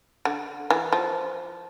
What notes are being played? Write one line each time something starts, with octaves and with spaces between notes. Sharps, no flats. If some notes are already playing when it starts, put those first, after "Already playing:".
D3
E3
F3